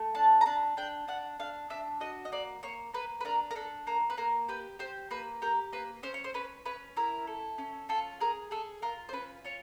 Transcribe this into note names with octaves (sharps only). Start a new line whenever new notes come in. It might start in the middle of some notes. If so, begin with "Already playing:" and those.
Already playing: A3
D4 A5
A#5
D4 A5
D4 G5
D4 F#5
D4 F5
D4 E5
F#4 D#5
D#5
A#3 D5
A#3 C#5
A#3 B4
B4
D4 A#4
A#4
D4 A4
A#3 A#4
B4
A#3 A#4
G4 B4
G4 C5
A#3 B4
G4 A#4
A#3 B4
C#4 C5
C#5
C5
C#4 B4
C#4 B4
E4 A#4
A4
C#4
F4 A4
G#4 A#4
G#4 A4
F4 A#4
C5
C#4 B4
F4 C#5